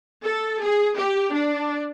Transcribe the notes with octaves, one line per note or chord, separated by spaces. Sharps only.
A4
G#4
G4
D4